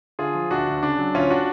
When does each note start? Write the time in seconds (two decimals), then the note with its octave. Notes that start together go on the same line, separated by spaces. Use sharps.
0.19 D3 F4 G#4
0.35 F3
0.51 D2 D4 F#4
0.67 D2
0.83 C#3 D4
0.99 F#3
1.14 D2 C#4 F4
1.30 D4 F#4